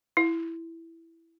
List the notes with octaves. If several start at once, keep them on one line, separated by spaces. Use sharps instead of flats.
E4